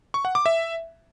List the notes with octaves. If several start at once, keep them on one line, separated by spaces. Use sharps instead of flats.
C#6
F#5
D6
E5